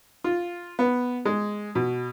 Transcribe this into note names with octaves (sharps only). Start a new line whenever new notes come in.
F4
B3
G#3
B2